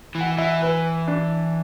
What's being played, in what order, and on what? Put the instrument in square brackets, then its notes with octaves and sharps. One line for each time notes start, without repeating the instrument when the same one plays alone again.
[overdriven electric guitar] E3
[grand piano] F#5
[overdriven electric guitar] E3 [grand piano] E5
[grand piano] B4
D4